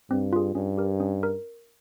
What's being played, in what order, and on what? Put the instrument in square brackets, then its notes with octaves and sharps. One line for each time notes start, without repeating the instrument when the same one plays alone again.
[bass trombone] G2 [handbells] C4
[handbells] F4 G#4
[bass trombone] G2 [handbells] C#4
[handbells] G4 A#4
C#4
A#4